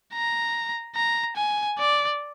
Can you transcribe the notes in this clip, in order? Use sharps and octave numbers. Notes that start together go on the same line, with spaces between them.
A#5
A#5
G#5
D5